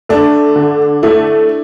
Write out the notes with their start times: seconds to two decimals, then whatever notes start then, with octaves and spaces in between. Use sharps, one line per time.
0.09 A3 D4
0.56 D3
1.03 A3 E4